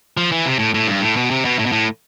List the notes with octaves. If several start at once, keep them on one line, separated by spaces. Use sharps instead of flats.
F3
E3
C3
A2
A2
G2
A2
B2
C3
B2
A2
B2
A2